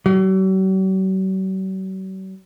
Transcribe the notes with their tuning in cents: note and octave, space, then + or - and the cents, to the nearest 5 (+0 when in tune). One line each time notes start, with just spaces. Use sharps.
F#3 +45